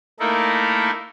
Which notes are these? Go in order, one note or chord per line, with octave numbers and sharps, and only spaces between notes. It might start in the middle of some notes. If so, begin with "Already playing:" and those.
A3 A#3 D#4 E4 A4 A#4